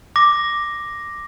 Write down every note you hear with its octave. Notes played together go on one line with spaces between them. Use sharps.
D6 A#6